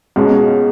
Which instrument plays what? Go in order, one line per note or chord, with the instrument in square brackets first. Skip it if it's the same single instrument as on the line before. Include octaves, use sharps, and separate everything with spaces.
[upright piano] C#2 B2 G#3 C#4